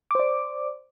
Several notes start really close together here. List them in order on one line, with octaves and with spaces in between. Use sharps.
D6 C5 D5